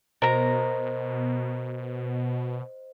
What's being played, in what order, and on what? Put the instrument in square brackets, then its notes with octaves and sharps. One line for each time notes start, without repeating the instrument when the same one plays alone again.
[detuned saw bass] B2 [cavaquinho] A#4 A#5 [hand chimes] C5 D#5